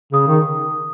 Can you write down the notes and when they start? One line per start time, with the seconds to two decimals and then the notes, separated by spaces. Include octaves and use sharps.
0.12 C#3 D#6
0.28 D#3